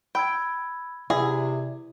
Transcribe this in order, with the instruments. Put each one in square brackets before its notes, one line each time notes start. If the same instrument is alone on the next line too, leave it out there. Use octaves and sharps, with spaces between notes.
[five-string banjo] G5 [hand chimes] B5 E6 G#6
[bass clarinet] C3 [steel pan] E4 [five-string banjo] G#4 [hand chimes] D5